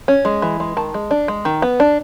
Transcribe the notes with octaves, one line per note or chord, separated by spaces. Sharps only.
C#4
G#3
E3
G#3
D#3 A5
G#3
D4
G#3
D#3
B3
D4